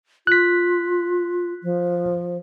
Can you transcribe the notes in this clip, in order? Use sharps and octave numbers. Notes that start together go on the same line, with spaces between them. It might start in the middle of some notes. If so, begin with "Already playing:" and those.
F4 F#6 B6
F3